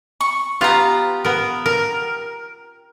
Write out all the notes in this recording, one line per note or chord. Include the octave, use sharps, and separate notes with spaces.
C#6
B3 F4 G4 F5 A#5
B3 A#4
A#4